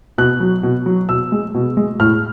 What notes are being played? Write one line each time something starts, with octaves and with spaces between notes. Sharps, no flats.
B2 F#6
F#3
B2
F#3
B2 E6
G#3
B2
G#3
A2 F6